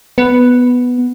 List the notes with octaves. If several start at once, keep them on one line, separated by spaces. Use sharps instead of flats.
B3